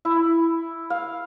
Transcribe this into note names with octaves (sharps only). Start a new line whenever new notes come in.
E4
F5